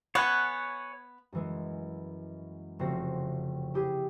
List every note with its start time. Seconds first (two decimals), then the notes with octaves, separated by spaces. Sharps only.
0.15 B3 C#5 F#5 G#5
1.32 F#2 E3 G#3
2.79 F1 C#3 C4 F#4 A#6
3.74 E4 G4 G#4